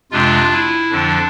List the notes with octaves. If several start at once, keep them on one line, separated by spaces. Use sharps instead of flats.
F2 C3 G#3 D4 F4
E4
F2 D3 F3 D4